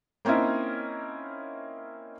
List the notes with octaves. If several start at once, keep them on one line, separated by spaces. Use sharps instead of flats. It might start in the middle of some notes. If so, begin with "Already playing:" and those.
A#3 C4 C#4 D#4 E4